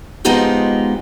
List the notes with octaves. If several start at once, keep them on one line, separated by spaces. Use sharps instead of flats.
F3 G#3 B3 D#4 F4 G4